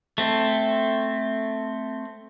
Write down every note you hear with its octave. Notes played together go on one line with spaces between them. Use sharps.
A3 C4